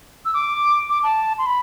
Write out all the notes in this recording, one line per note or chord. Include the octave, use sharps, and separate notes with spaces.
E6
D6
D6
A5
C6
B5